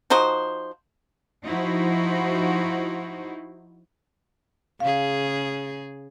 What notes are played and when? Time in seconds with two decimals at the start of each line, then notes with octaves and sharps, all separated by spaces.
0.10 F3 D#4 F#4 C5
1.44 F3 D#4 E4 F#4 C5
4.80 C#3 G#4 F5